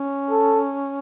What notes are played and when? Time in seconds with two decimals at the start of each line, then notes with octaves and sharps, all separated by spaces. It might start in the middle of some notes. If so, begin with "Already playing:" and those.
Already playing: C#4
0.31 A4